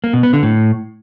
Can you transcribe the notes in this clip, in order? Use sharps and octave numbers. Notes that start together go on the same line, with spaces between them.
A#3
B2
B3
D3
A2